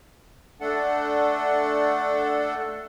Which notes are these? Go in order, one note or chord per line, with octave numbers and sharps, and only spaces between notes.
A3 D4 A4 F#5